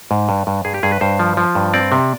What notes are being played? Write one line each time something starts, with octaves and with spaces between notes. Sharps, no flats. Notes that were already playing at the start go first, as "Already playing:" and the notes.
G#2
G2
G2
G2 G#4
G4
G2 G#4
B4
G2 C5
F3
F3
G2
C4 D5
C3